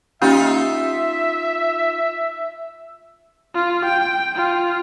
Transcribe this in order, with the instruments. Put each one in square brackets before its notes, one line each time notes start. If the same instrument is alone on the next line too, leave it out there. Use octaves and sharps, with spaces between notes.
[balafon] A#3 C#4 G4 [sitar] D#4 F4 [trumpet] E5
[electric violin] F4
G5
F4